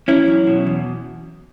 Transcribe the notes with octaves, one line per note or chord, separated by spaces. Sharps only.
E2 C#4 E4
F#3
B2
E2